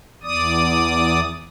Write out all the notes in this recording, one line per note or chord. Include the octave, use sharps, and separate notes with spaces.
E2 D5 D#6